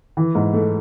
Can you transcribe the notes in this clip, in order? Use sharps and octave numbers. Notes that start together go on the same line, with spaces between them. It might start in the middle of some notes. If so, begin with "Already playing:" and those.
E3
G#2
A3